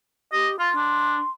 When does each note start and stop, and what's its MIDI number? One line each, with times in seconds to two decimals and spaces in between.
0.33 0.59 67
0.33 0.49 75
0.59 0.70 65
0.59 1.30 84
0.76 1.19 62